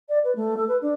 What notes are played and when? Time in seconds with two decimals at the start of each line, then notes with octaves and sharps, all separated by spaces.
0.08 D5
0.24 B4
0.35 A3
0.57 A4
0.68 B4
0.81 D4